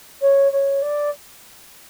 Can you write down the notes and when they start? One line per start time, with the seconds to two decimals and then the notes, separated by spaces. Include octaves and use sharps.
0.21 C#5
0.52 C#5
0.81 D5